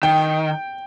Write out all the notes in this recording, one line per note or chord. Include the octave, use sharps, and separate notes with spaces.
D#3 G5